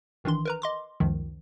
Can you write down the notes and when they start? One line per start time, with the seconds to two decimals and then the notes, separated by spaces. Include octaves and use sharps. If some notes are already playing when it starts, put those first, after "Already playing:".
0.24 G#1 D#3 E3 D4 C6
0.45 A#4 B4 A#5
0.62 D#5 C6 D6
1.00 C#2 F#2 D#3 F3